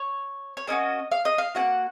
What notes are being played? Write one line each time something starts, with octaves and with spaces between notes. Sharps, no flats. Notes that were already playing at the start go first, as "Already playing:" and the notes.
Already playing: C#5
C#5
A#3 C#4 F#4 D#5
F5
D#5
F5
A#3 C#4 F#4 F#5